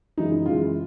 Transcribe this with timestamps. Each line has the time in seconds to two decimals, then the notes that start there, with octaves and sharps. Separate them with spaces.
0.18 F#2 C#3 E3 G#3 D#4
0.32 D#4
0.46 F#2 C#3 E3 G#3 F4